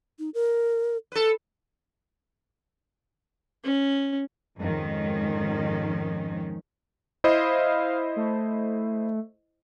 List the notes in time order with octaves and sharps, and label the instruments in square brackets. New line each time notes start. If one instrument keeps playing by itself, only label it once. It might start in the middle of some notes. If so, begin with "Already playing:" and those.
[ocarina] D#4
A#4
[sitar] A4 B4
[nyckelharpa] C#4
[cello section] F2 G#2 D#3 C#4
[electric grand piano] E4 C5 D#5 [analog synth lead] F5
[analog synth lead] A3